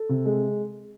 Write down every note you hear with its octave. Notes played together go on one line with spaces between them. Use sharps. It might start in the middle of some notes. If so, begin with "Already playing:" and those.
Already playing: A4
C3
G#3